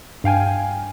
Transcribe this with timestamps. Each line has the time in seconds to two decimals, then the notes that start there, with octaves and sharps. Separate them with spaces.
0.24 G2 F5 G5 G#5